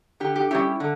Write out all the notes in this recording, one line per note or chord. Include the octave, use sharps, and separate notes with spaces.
D3 G4
G4
G3 C#4 E4 G4
D3